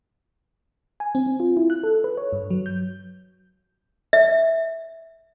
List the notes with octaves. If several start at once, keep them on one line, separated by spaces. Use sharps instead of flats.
G#5
C4
C4
F4
E4
F#6
A4
B4
C#5
G2
F#3
G6
E5